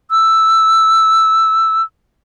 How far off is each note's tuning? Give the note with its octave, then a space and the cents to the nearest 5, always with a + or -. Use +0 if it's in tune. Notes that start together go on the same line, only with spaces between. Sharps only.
E6 +5